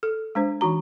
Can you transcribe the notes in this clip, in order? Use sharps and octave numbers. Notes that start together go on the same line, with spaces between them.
A4
G#3 D4 C5
E3 D#4 F#4 A#5